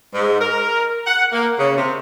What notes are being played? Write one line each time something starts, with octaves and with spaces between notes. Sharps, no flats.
G#2
A#4
F#5
A#3
C#3
C3